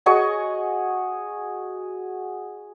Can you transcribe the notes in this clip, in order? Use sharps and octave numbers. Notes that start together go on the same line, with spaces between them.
F#4 G#4 D#5 C#6